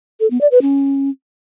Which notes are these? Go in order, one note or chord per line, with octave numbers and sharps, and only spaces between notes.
A4
B3
D5
B4
C#4